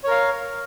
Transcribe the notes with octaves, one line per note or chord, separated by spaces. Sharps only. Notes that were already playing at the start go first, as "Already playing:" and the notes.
A#4 C#5 F5